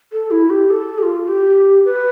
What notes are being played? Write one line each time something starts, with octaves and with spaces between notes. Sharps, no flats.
A4
E4
G4
A4
G4
F4
G4
B4